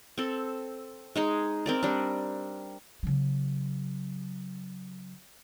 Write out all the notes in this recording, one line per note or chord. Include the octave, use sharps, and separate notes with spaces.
C4 A4
G#3 D#4 G#4
C4 A#4 D5
G3 D4
C#3 F#3